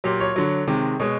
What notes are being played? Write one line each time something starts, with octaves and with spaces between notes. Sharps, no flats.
A#2 F#3 G4
C#5
D3 F#3
C3 D#3 G#3
B2 G#3 C#5